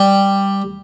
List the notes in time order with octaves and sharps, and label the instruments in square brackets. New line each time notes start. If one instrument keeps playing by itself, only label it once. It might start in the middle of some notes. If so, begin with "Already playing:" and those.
Already playing: [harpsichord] G3